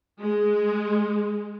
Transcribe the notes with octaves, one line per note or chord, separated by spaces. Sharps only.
G#3